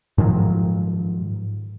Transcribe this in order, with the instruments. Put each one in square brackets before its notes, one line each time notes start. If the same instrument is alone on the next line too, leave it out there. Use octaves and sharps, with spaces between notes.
[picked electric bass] G#2 D#3 F3 F#3